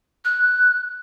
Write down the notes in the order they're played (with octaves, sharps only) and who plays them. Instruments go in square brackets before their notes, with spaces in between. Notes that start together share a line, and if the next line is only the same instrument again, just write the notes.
[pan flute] F#6